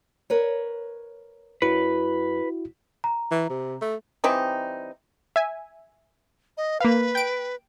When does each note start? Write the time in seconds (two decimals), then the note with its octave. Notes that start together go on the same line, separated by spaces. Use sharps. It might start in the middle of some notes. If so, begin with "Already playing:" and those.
0.30 A#4 B4 C#5
1.62 F#2 E4 F#4 B4
3.04 A#5
3.31 E3
3.50 C3
3.82 A3
4.24 E3 G3 C4 D#4
5.36 E5 G#5
6.57 D#5
6.80 A#3 B4 F5
7.15 G5 D7